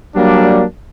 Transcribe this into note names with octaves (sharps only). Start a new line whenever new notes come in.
F#3 G3 A#3 D4